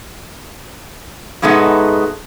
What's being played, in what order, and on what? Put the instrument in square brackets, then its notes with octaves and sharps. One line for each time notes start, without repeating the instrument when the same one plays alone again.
[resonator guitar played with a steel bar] G#2 B2 G#3 A3 B3 D#4